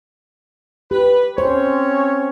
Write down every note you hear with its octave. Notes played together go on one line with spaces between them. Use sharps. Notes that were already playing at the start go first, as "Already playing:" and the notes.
G4 B4
C4 C#4 C5 C#5